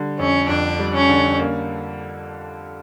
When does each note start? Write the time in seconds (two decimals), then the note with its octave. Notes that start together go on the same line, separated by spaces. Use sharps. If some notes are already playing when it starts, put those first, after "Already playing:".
Already playing: D3 G3
0.19 F2 C#4
0.49 F2 D4
0.79 G3
0.94 C#4
1.09 D3
1.39 A#3